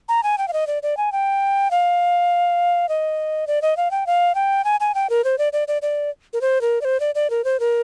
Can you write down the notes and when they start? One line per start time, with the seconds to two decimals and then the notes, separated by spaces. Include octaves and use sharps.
0.09 A#5
0.23 G#5
0.38 G5
0.48 F5
0.53 D#5
0.67 D5
0.83 D5
0.97 G#5
1.12 G5
1.71 F5
2.89 D#5
3.47 D5
3.62 D#5
3.77 F5
3.91 G5
4.07 F5
4.35 G5
4.65 G#5
4.80 G#5
4.95 G5
5.10 A#4
5.24 C5
5.38 D5
5.53 D5
5.68 D5
5.82 D5
6.33 A#4
6.41 C5
6.61 A#4
6.81 D5
6.85 C5
7.00 D5
7.15 D5
7.30 A#4
7.44 C5
7.60 A#4